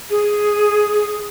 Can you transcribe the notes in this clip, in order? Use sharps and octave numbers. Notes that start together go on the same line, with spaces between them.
G#4